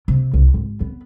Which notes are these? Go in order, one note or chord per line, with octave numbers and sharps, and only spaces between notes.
C3
C2
G#1
B3